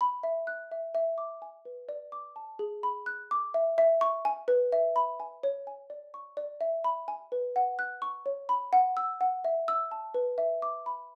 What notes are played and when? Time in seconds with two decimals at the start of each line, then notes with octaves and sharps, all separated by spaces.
0.01 B5
0.23 E5
0.47 F#6
0.72 E5
0.95 E5
1.18 D6
1.42 G#5
1.65 B4
1.89 D5
2.12 D6
2.36 A5
2.59 G#4
2.83 B5
3.06 F#6
3.31 D6
3.54 E5
3.78 E5
4.01 C#6
4.25 G#5
4.48 B4
4.72 E5
4.96 B5
5.20 G#5
5.43 C#5
5.67 G#5
5.90 D5
6.14 C#6
6.37 D5
6.61 E5
6.84 B5
7.08 G#5
7.32 B4
7.56 F#5
7.79 F#6
8.02 C#6
8.26 C#5
8.49 B5
8.73 F#5
8.97 E6
9.21 F#5
9.45 E5
9.68 E6
9.91 A5
10.14 B4
10.38 E5
10.62 D6
10.86 B5